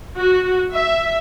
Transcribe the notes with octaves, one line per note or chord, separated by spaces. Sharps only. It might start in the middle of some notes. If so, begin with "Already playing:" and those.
F#4
E5